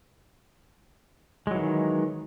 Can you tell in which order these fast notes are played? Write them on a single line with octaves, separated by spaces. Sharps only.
G#3 F#3 E3 D#3